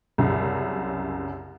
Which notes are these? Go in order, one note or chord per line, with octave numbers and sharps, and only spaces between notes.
C2 F#2 C#3